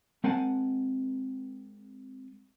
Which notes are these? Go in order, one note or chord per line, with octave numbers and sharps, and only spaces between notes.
G#3 C4 A#4 F#5 G#5 A5